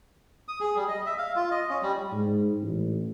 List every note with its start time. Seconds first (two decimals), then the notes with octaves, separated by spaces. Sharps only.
0.48 D#6
0.60 G#4
0.76 G3
0.88 D#5
1.06 E5
1.18 F5
1.36 F4
1.51 D#5
1.70 C#4
1.82 G3
2.12 G#2
2.62 A1